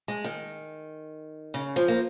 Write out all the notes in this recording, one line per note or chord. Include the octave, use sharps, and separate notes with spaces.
G#3
D#3
C#3
F3
A#3